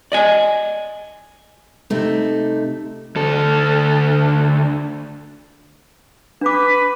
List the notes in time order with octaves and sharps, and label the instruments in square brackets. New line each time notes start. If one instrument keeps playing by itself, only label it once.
[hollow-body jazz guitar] D5 D#5 G#5
[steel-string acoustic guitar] C3 A3 D#4
[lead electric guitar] D2 A4
[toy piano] D4 D6 [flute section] B4